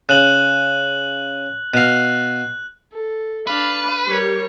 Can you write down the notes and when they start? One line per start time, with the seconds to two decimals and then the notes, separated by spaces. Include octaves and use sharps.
0.09 C#3 F#6 F#7
1.74 B2 F5 F#6
2.92 A4
3.47 D4 B4 F5
4.06 G3 G4 A#4 C#5